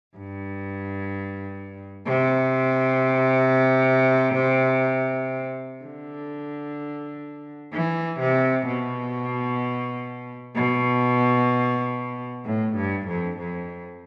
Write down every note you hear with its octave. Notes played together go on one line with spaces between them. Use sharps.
G2
C3
D3
E3
C3
B2
B2
A2
G2
F2
F2